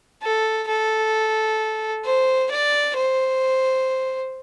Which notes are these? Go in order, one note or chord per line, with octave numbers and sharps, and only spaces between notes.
A4
A4
C5
D5
C5